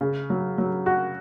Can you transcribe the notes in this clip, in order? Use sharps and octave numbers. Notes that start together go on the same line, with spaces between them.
C#3
F#3
F#3
F#4